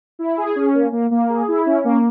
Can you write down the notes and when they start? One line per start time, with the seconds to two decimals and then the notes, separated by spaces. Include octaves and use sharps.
0.19 E4
0.37 G#4
0.56 C#4
0.74 A#3
0.92 A#3
1.11 A#3
1.29 G#4
1.48 E4
1.66 C#4
1.84 A#3